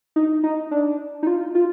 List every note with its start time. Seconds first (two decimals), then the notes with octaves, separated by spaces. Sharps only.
0.16 D#4
0.44 D#4
0.71 D4
1.23 D#4
1.27 F4
1.55 F4